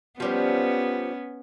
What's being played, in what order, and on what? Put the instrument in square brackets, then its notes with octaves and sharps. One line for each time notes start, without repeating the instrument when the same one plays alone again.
[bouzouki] F3 G3 C5 [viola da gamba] B3 C#4